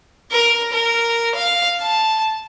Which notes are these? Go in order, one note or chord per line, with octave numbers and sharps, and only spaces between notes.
A#4
A#4
F5
A5